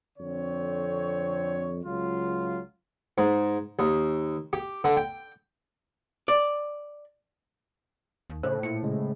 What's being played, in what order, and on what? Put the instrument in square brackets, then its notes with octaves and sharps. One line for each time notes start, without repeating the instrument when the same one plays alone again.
[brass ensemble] F2 D3 C4 C#5
C#2 F#3 F4
[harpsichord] G#2
D#2
G4
D3
G5
[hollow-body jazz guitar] D5
[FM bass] D#2
[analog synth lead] A2 [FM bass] C#3 [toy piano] C5
[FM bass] A#2 [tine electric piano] C#7
[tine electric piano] C#3 G#3